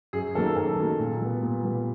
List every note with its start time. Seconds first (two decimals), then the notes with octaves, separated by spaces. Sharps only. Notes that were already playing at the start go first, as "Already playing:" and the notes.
0.13 F#2 G#4
0.35 D#3 F#3 A#3 A4
0.56 F#2 A4
0.78 D#3 F#3 A#3
0.99 A#2
1.22 G3 B3
1.43 A#2
1.64 G3 B3